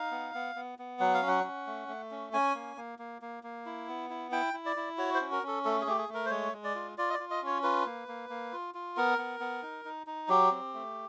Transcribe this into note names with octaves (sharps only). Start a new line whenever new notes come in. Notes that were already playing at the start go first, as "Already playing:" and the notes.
Already playing: D#4 F5
B3
B3
B3
B3
F#3 F#5
F5
C#4
F#5
C#4
A3
A3
C#4
C#4 G#5
A#3
A#3
A#3
A#3
A#3
E4
B3
E4
E4 G5
E4
D5
E4
F#4 C#5
C5
C#4
A#4
C#4 A4
A3 A4
G#4
A3 G4
G#4
A3
A#4
C5
G#3 C#5
G#3
D5
F4
F4 D5
D#5
D5
F4
D#5
C#4 C#5
F4 B4
A#3
A#3
A#3
F4
F4
B3 A#4
B3
B3
D#4
D#4
D#4
F#3 G4
C4
A3